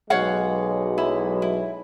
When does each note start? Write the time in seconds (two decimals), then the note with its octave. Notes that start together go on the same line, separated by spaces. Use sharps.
0.10 B1 F#3 G#3 C#5 F5 F#5
0.98 E4
1.42 E4